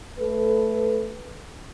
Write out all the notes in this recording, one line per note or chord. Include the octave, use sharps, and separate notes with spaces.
A3 A4 B4